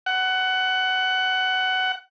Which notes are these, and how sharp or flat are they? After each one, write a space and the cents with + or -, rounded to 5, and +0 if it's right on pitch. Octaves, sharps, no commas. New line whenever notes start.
F#5 +15